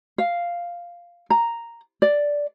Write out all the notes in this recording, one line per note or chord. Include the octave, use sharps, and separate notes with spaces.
F5
A#5
D5